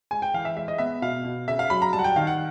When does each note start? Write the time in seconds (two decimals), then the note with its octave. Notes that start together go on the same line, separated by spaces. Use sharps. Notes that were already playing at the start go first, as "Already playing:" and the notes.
0.11 G#3 G#5
0.22 G5
0.34 E3 F5
0.45 E5
0.56 G#3 E5
0.68 D#5
0.78 B3 E5
1.02 B2 F5
1.25 B2
1.48 C#3 E5
1.59 F5
1.70 F#3 B5
1.82 A#5
1.93 G3 A5
1.99 F#5
2.04 G5
2.16 D#3 F5
2.27 F#5